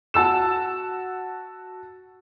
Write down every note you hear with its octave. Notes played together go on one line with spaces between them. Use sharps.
F#4 A5 E6 E7